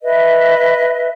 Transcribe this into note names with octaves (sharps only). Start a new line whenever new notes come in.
B4 D#5 E5